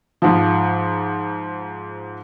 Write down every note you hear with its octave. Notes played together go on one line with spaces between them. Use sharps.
G#2 F3